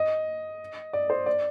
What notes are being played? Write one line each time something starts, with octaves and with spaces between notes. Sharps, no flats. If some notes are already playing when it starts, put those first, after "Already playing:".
Already playing: D#5
D5
C5
D5